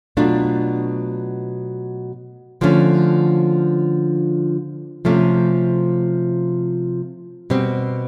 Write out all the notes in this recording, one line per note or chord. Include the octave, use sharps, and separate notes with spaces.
B2 F#3 A3 D4 F4
D3 F3 A3 C#4
C3 F3 A3 C#4
B2 G3 C4